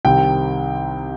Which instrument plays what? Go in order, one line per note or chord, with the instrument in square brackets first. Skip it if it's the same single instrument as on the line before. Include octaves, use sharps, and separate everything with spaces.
[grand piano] C2 C3 D#3 G5